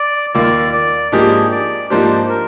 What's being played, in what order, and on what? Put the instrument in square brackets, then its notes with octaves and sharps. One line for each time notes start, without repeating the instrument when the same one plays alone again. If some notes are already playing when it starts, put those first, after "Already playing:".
Already playing: [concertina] D5
[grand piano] D#2 D#3 A#3 F4 [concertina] D5
[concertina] D5
[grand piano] G#2 F3 A#3 D4 G4 [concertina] G#4
[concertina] D5
[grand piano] G#2 F3 A#3 D4 G4 [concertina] C5
[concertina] A#4